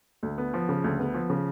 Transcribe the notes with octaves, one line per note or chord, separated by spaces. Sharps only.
D2
B3
F3
C#3
D2
B3
F3
C#3